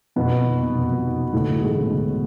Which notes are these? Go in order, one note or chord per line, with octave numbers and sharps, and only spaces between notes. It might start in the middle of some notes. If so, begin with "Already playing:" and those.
F2 B2 B3
F2
D#3
C3
F2
F2
D#3
C3
D2 A2 A3
D2
A3
G#2 E3 G#3
C#3
D2